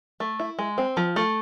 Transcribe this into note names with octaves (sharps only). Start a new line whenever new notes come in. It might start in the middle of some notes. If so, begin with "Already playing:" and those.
A3
E4
G#3
C4
F3
A3